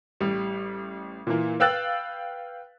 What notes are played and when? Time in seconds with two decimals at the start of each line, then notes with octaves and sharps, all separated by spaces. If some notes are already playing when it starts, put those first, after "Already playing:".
0.20 A1 G3
1.27 A#2 E3 A#3
1.60 B4 F5 G5 E6 F#6 A6